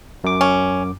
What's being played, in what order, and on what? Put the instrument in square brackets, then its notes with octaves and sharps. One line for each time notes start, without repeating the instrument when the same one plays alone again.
[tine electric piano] F#2 D6
[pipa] C#4